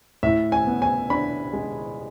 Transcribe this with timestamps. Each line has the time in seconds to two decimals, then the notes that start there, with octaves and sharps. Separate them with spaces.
0.23 A2 E5
0.52 G#5
0.67 B3
0.82 G#5
1.10 D4 B5
1.53 G#3